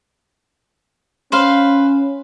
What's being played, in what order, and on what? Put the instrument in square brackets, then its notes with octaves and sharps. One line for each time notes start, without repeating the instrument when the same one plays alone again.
[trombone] C#4 [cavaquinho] B4 C5 F5